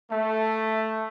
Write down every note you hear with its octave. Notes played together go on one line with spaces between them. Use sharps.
A3